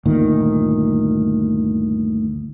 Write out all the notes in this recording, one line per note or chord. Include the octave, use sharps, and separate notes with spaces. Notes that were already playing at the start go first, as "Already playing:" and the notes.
G1 D2 A#2 D#3